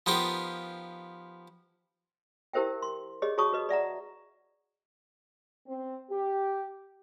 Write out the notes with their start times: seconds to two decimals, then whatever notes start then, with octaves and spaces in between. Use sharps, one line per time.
0.06 F3 B3 D#4 F4 G4 A#4
2.53 E4 G4 A#4 C5 E5 G5
2.82 C6
3.22 G4 G#4 C#5 D#5
3.38 F#4 G#4 C#5 A5 C#6 D#6
3.52 F#4 B4 D#5
3.69 D5 E5 F#5 A#5
5.67 C4
6.11 G4